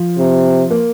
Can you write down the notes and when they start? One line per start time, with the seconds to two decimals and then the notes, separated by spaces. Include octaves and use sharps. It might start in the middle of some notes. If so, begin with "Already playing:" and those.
Already playing: F3
0.19 C3
0.71 A#3